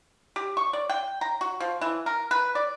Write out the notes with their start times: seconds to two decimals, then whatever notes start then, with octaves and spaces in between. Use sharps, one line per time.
0.36 G4
0.57 C#6
0.73 D5
0.90 G5
1.21 A#5
1.41 F#4
1.60 F3
1.81 E3
2.06 A#4
2.31 B4
2.55 D5